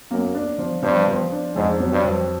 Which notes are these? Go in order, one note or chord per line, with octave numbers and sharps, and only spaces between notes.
F#2 A#3
D4
F3
G2 F3
F3
D4
F2 G#2
F#3
G2
F2